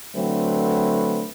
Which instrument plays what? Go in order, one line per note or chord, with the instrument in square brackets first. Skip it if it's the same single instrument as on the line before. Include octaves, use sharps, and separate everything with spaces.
[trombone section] D3 F#3 A3 C4 B4